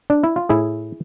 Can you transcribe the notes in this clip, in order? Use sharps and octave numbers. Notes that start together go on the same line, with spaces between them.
D4
E4
F4
A2 E4 G#4